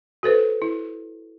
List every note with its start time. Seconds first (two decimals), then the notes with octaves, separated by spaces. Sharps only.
0.23 F#4 A4 B4 C5
0.62 E4